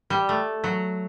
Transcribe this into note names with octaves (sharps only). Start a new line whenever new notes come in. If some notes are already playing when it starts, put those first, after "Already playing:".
G3
A3
F#3